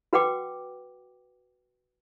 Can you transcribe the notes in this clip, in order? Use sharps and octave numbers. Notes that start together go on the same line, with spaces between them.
F#4 B4 F#5 G5 D6